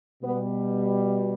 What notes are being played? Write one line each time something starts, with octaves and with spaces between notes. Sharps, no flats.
B2 G3 B3